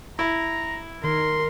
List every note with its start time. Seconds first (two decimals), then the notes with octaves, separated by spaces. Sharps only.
0.19 E4 A#5
1.04 D#3 A#4 C6